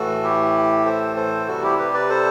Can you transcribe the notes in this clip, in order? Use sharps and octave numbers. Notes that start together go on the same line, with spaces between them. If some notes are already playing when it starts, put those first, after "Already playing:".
Already playing: A2 E3 A3 F#4 A4
E4 G4
A4 C5
A4 C5
C3 G3 F#4 A4
E4 G4
G4 B4
B4 D5
A4 C5